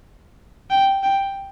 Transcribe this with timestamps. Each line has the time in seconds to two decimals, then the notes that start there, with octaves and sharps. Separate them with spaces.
0.70 G5
1.03 G5